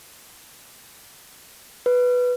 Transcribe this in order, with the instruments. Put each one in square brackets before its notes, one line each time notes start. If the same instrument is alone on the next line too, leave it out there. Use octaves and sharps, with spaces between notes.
[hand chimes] B4